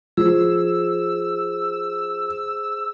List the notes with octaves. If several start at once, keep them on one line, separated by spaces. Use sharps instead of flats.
F3 G#4 C5 E6